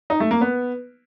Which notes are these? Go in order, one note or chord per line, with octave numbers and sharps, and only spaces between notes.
D#4
A3
A#3
B3